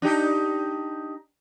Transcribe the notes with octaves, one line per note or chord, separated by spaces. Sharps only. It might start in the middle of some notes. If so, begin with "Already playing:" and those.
D4 D#4 G4